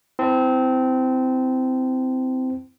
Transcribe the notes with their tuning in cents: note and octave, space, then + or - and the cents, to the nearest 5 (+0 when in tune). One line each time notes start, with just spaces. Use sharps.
C4 -20 E4 +0 A5 +0